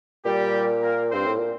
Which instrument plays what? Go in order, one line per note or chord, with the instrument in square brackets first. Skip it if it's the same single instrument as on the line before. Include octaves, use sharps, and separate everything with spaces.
[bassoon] A#2 [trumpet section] G3 G4
[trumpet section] A#3 A#4
[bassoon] G2 [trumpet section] C4 C5
[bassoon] A2
A#2